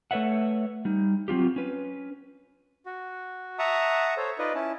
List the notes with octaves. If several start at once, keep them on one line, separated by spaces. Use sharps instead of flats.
A3 A4 B4 C#5 E5 F#5
G3 D#4
F#3 C4 F4 G4
C#4 B4
F#4
E5 F#5 A5 A#5 C#6 D#6
A4 C5 C#5
D#4 F4 B4 D5 D#5
C#4 E4 A5